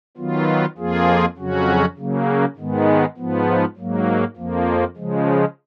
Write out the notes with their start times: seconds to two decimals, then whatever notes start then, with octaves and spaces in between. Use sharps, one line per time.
0.17 D#3 F#3 B3 F4
0.77 F2 F3 A#3 F4 G#4
1.37 F2 C#3 F#3 C#4 F#4
1.97 C#3 F#3 A#3
2.56 G#2 D#3 G#3 B3
3.17 G#2 F3 B3
3.76 G#2 F#3 A#3
4.36 F2 F3 A#3
4.97 C#3 F3 G#3